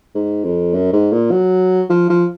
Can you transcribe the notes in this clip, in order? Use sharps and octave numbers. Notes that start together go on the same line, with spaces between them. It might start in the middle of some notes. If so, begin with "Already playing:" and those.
G#2
F2
F#2
G#2
A#2
F#3
F3
F3